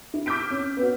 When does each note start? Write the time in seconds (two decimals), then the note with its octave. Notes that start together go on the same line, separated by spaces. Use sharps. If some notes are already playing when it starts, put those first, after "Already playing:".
0.14 E4
0.26 D6 E6 F6 G6 B6 D7
0.51 C#4
0.77 B3 C#4 F#4